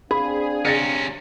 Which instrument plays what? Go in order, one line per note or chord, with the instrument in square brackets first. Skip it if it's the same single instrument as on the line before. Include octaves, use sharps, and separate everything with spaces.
[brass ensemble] C4 D4 F5 [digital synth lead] G#4 [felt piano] B5
[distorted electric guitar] C3 C#4 [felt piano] A6 A#6 C#7